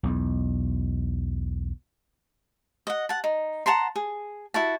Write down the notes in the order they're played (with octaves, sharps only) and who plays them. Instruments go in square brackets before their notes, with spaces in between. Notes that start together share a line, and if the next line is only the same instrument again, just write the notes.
[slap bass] B1 E2
[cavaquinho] D#5 F#5
F#5 A5
D#4
F#5 A5 A#5 C6
G#4
E4 F#4 A5